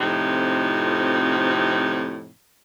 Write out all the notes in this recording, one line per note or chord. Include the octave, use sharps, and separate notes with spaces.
F2 A2 C3 F3 D#4